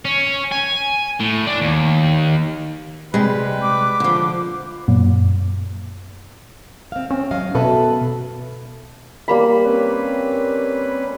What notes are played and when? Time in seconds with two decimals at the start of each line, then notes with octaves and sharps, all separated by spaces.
0.05 C#4
0.51 G#5
1.20 A2
1.46 D4
1.61 D#2
3.14 C3 G3 G#3 B4
3.62 D6
4.00 D3 F3
4.88 F#2 A#2
6.92 C4 F5
7.10 C4 C#4
7.31 F#3 D#5 F5
7.55 B2 A4 B4 E5
9.28 G3 A#3 B5
9.63 C4 C#4 B4